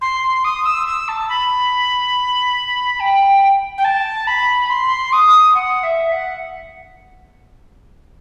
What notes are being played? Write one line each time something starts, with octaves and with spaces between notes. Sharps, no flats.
C6
D#6
E6
E6
A5
B5
G5
G5
A5
B5
C6
D#6
F#5
E5
F#5